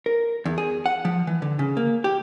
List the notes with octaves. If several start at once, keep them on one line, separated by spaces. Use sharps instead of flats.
A#4
E2
G#4
F#5
F3
E3
D3
C#3
A#3
G4